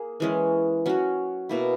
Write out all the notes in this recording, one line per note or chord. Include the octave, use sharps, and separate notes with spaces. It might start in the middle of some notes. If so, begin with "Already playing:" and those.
Already playing: A#3 G#4
E3 G#3 C#4
F#3 C#4 F#4
B2 A#3 E4